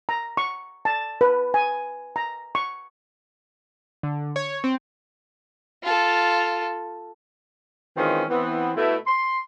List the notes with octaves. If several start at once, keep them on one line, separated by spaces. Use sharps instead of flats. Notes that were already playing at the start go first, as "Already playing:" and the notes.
A#5
C#6
A5
B4
G#5
A#5
C#6
D3
C#5
C4
F4 A4
D#3 E3 G#3 C4 C#4 F4
E3 B3 C4
B2 A3 E4
C6